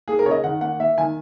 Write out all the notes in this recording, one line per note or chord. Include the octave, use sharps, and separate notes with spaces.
A#3 G#4
A#4
C#3 C#5
D#5
D#3 F#5
A#3 F#5
A#3 E5
D#3 G#5